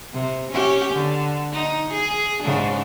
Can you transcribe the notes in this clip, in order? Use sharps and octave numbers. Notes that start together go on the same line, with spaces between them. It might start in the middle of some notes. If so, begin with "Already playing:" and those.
C3
C#4 G4
D3
D#4
G#4
G#2 C#3 D4